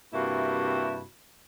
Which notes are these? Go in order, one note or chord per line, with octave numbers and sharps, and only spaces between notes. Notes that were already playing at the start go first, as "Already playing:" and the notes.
G2 C3 A#3 E4 F#4